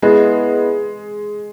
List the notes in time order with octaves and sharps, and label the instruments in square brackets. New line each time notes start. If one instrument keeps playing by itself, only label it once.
[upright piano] G#3 [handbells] B3 E4 B4 D#5